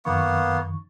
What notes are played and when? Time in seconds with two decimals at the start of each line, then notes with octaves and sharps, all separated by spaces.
0.05 F#2 D#3 A#3 B3 C#6